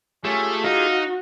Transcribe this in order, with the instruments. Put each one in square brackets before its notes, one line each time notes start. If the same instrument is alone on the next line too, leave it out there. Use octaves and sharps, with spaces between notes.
[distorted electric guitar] A3 [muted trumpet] C#4 [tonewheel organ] F4 G4 G#4
[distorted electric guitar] D#4 [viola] F#4 [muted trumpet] F5